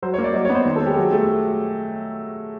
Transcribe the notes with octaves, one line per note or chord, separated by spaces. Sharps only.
F#3 C5
C#5
A#3
D5
F#3 D#5
C#5
B3
C5
D#3
A4
G#3 G4
F#3
A3